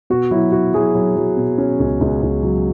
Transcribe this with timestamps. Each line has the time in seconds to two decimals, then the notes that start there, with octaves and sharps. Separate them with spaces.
0.10 B2 F#4
0.31 F#3 E4
0.52 F#3 F#4
0.74 F#3 E4 G#4
0.95 F#3
1.16 F#3
1.37 B2
1.58 C#4
1.79 C#2
2.01 C#2
2.22 C#2
2.43 F#3